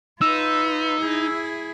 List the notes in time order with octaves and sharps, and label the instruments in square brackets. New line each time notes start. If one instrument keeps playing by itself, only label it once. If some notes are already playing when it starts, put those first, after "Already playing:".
[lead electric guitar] D#4 [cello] F4 B4 [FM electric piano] E6
[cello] E4 G#4